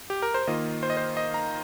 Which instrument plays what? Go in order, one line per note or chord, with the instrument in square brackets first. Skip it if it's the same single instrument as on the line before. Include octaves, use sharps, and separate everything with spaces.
[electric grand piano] G4
A#4
C5
D#3 A#3 F4 D#5
C5
D#5
C5
D#5
A#5